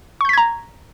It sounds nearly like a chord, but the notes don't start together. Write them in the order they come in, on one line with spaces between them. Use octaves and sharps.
C#6 G6 B6 G#6 A#5